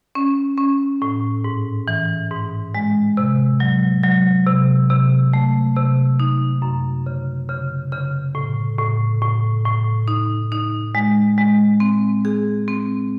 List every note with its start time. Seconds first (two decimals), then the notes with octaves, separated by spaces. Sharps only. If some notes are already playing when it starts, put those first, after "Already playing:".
0.15 C#4
0.57 C#4
1.02 A2
1.44 G#2
1.88 E3
2.31 G#2
2.75 G#3
3.17 C3
3.60 F#3
4.03 F#3
4.47 C3
4.90 C3
5.33 A3
5.76 C3
6.20 D#4
6.62 F#2
7.06 C#3
7.49 C#3
7.92 C#3
8.35 A2
8.79 A2
9.22 A2
9.65 A2
10.08 D#4
10.52 D#4
10.95 G#3
11.38 G#3
11.80 C4
12.25 G#4
12.68 C4